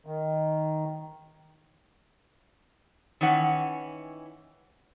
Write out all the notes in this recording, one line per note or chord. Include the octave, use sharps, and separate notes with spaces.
D#3
D#3 E3 C#4 F#5